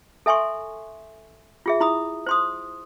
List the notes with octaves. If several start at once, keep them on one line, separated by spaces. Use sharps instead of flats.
A4 E5 G#5 C6 C#6
F4 G#4 E5
E4 B5 D#6
C5 C6 D#6